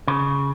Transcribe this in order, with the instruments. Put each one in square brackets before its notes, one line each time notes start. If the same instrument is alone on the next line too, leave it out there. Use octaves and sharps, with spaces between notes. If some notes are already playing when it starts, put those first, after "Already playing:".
[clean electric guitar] C#3